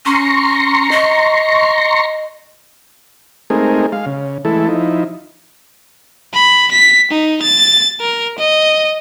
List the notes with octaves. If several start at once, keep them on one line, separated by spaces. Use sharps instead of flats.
C#4 A#5 C6 C#6
D#5
G#3 A3 C4 D#4 G#4 A#4
G#3 F5
C#3
E3 G#3 A3 E4 A4
F3 D#4 E4
B5
B6
D#4
A6
A#4
D#5